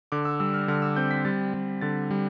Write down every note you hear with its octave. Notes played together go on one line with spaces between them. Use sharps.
D3 D6
E6
G3 E6
F6
D3 F6
E6
C4 G6
B6
G3 A6
G3
D3 A6
G3